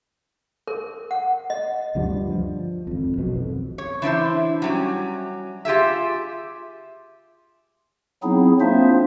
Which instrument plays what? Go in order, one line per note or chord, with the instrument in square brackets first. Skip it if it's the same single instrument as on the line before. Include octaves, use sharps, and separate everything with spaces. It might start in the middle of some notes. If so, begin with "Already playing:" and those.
[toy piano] A#4
F#5
D#5
[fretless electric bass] D2 G2 F3 D4
F3
G#1 F2
B1 F#2 B2
F2
[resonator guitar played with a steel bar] C#5
E3 D4 E4 C5
F#3 G3 C#4
F4 G4 G#4 E5
[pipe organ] F#3 B3 C4 D#4 E4 G#4
A#3 C4 D4 F4 C5 E5